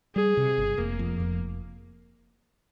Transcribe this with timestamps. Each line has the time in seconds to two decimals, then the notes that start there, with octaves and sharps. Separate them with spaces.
0.16 G3 G#4
0.37 C3
0.58 G1
0.78 F1 A#3
0.99 F2
1.20 F1